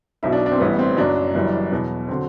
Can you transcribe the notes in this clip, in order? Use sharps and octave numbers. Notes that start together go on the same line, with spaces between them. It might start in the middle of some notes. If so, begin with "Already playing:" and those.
B1 B2 F#3 E4
D4
D4
C4
A1 A2 G3 B3
C4
F#1 F#2 F#3 D4
F#1 F#2 E3 G3
E2 B2 F#3
D3 F#3 C4